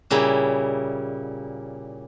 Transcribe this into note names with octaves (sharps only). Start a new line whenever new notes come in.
A#2 C#3 G3 A#3 E4